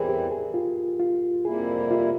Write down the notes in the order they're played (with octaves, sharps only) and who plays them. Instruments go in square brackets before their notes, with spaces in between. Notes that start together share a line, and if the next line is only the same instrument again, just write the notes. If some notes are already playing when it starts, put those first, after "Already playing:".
Already playing: [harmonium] E2 E3 G3 C4 E4 [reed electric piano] G#4 A#4
[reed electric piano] G4
G#4
F4
F4
[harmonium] F2 C3 G3 A#3 E4 [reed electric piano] G#4
[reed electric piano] F4